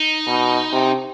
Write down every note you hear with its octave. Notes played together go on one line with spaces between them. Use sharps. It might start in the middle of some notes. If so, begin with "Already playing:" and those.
Already playing: D#4
B2
C3